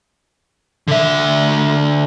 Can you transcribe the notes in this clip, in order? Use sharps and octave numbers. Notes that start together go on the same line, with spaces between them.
D3 E5